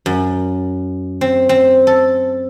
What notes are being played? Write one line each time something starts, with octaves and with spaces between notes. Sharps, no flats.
F#2
C4
C4
A4